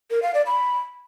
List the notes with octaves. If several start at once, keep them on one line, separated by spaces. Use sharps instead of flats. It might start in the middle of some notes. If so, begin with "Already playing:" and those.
A#4
F5
D5
B5